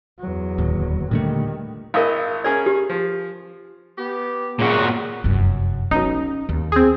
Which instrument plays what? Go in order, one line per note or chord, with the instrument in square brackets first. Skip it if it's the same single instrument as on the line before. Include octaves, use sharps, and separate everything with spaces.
[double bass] E2 F#3
[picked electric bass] D1 D#2
[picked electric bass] A#2 D3 A3 [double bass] D#3 G3
[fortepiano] G#1 E4 D#5 [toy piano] A#4 F5
[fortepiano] C#4 G#4 A#4 [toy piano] D5
[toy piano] G4
[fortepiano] F3
[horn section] B3 G4
[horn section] F#2 C#3 [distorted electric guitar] A#2 F#4
[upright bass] F1 F#2
[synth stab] B1 D#4 [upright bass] C#4
[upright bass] D#2
[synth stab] C4 G#4